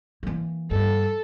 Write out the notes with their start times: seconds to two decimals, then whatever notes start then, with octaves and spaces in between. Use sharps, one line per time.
0.23 E3 A#3
0.71 G2 A4